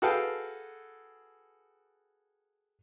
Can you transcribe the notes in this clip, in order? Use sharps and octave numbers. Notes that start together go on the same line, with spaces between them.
F#4 G#4 A4 B4 F5 G5